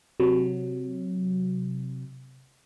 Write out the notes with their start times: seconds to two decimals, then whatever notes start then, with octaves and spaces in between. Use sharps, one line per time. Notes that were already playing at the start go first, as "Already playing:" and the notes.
0.20 C3 F#3